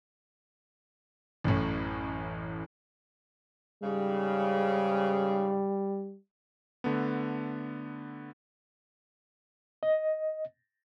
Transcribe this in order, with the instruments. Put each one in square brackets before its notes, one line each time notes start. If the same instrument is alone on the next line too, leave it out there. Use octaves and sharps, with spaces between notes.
[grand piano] A1 F#2 A2
[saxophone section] G#2 C#3 [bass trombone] G3
[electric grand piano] D3 A3 B3
[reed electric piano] D#5